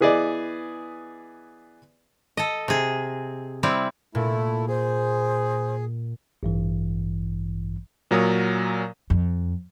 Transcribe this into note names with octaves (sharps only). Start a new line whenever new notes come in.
E3 B3 G#4 B4 D5 D#5
A4 D#5
C3 G#4
G3 C4 E4
A#2 A3 E4
G#4 C5
A1 G2 E3
A#2 F#3 A#4 C#5 D#6
F2